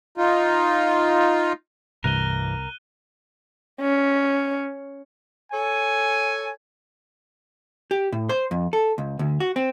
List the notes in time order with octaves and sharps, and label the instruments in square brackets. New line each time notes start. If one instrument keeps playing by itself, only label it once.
[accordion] D#4 F4
[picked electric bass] C2 [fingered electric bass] G2 C3 E3 [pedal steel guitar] A#4 [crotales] F#6 D#7 G7
[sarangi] C#4
[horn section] A4 C#5 G#5
[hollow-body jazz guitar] G4
A2
C5
F2
A4
C#2
D2
F#4
C4